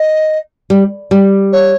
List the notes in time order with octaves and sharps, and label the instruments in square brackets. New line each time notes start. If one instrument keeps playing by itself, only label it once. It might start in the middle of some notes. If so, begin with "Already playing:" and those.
Already playing: [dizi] D#5
[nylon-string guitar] G3
G3
[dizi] C#5